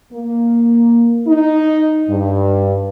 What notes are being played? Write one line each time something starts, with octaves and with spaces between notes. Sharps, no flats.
A#3
D#4
G2